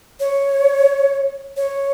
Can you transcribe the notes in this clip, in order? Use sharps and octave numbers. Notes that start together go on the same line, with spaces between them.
C#5
C#5